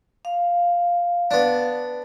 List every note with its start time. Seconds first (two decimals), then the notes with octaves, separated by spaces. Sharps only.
0.25 F5
1.31 B3 D4